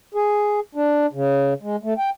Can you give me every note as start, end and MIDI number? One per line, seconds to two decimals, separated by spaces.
0.14 0.60 68
0.75 1.06 62
1.13 1.54 49
1.62 1.76 56
1.83 1.94 57
1.98 2.10 79